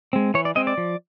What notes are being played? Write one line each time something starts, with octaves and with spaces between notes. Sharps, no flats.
G#3 C4
E3 C#5
D5
G#3 C4 D#5
D5
F3